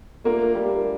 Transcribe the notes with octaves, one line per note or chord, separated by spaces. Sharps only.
A3 A#3 D4 F4 A#4
G3 A3 D4 F4 A#4